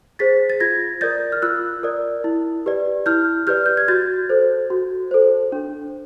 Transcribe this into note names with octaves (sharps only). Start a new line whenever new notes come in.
G#4 C5 A6 B6
A6
F4 G#6 A#6
A#4 D5 G6 A6
F6
F4 E6 F#6
A#4 D5
E4
G4 B4 D5
E4 F6 G6
G4 B4 D5 F6 G6
G6
G#6
F#4 G6 A6
A4 C5
F#4
A4 C5
D4